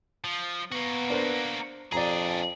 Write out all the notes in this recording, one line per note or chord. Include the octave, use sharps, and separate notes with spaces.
F3
A#3 B3 F#4
D4 A#4 C5
F2 D4 G#4 D5 A#5